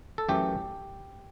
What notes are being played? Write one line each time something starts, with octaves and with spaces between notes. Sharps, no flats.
A4
F#2 E3 A3 G4